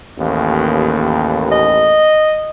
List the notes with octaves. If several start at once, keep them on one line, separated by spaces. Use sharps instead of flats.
A1 D#2
D#5